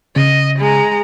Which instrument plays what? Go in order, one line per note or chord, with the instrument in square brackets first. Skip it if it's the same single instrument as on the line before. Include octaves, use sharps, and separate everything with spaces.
[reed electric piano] C#3 [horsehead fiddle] D#5
[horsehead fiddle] G#3 A#5